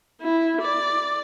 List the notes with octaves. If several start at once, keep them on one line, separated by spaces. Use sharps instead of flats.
E4
D5